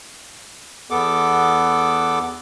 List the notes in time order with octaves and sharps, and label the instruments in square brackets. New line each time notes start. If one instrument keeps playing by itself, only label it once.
[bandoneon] E2 B3 A4 D6